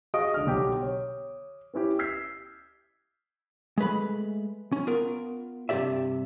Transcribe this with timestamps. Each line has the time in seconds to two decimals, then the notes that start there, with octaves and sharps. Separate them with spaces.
0.14 F#4 G#4 D#5 F5 D#6 D7
0.34 C#2 D3 F6
0.47 B1 D3 G4 G5 D6
0.82 C#5
1.73 B3 C#4 E4 G4
1.99 E6 F6 G6 G#6 B6 C7
3.78 G#3 A3 B4 B5
4.72 C#4
4.87 B3 F4 A#4
5.69 G2 C3 B3 G4 D5 E5